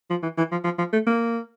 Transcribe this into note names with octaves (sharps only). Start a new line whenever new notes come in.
F3
E3
E3
F3
F3
F3
A3
A#3